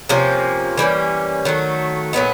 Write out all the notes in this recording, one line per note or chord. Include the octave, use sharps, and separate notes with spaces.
C3 F3 A#3 C#4
E3 G3 A#3 C#4
D#3 F#3 A3
A#2 F#3 B3 D#4